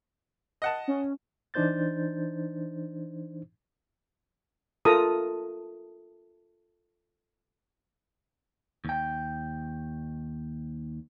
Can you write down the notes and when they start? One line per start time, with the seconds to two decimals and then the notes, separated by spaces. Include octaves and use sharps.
0.62 D#5 F#5 A5
0.88 C#4
1.54 E3 D4 D#4 C5 G6 A6
4.85 F4 A4 A#4 A#5 D#6
8.85 D#2 G5